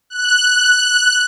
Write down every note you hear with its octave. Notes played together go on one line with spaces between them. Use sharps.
F#6